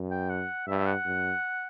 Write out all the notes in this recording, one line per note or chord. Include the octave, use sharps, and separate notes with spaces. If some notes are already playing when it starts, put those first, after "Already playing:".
Already playing: F#2
G5
F#5
G2 E5
F#5
F#2